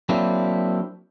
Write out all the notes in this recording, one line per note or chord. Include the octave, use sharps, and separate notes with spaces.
F#3 A#3 C4 D4 E4